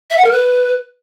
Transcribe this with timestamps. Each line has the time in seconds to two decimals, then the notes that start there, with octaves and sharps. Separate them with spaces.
0.11 E5
0.18 F#5
0.25 A#4
0.32 B4